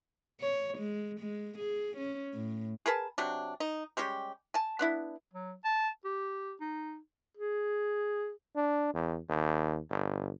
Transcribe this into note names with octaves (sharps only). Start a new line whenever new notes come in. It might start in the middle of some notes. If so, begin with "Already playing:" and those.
C#5
G#3
G#3
G#4
C#4
A2
G#4 A#4 B4 A5
C3 F#3 D4
D#4
G3 G#3 C#4 G4
G#5 A5
B3 D4 E4
F#3
A5
G4
D#4
G#4
D4
E2
D#2
G1